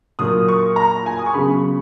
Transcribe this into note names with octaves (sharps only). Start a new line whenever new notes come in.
A#2 F#3 A#3 D#6
C#6
A#5
G#5
D#6
C#6
C#3 F#3 B3 B5
C#6